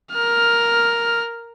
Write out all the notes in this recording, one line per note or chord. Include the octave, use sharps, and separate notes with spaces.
A#4 F6